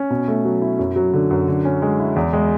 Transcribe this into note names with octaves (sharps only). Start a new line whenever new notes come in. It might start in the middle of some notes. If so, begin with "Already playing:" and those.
Already playing: C#4
B2
A3
F#3
E4
F#2
F#3
D3
F#2
D3
C#4
G#3
E4
E2
G#3